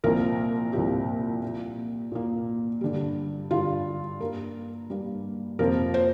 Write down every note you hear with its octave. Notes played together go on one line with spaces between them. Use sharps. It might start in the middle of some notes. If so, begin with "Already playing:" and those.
C2 A#2 F3 A#3 A#4
C2 A#2 F3 A#3 G4
A#2 A#3
A#2 A#3
G2 D3 G3
G2 D3 G3 F4
G2 G3 A#3 A#4
G2 G3 A#3
F2 C3 F3 A#3 A#4
C5